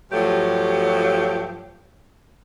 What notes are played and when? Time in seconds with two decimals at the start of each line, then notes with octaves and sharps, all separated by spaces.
0.11 G2 F3 F#3 A3 G4